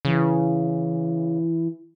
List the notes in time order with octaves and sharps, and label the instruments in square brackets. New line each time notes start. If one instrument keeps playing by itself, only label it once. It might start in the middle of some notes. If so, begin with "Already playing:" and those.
[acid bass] C#3 [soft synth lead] E3